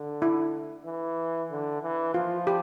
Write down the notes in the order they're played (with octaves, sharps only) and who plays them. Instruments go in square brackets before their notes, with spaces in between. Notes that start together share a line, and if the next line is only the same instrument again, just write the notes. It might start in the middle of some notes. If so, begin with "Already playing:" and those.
Already playing: [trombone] D3
[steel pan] E4
[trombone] E3
D3
E3
[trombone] F3 [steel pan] F4
[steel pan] G4